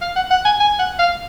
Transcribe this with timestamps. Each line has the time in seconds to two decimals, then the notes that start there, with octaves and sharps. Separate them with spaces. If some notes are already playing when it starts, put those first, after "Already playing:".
0.02 F5
0.16 F#5
0.31 F#5
0.45 G#5
0.60 G#5
0.79 F#5
0.99 F5